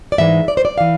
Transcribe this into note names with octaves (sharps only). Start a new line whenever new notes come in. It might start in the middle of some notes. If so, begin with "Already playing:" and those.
D5
G#2 E3 G#3 E5
D5
C5
D5
E3 F5